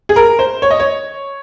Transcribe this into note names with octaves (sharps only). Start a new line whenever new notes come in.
G#4
A#4
C5
C#5
D#5
C#5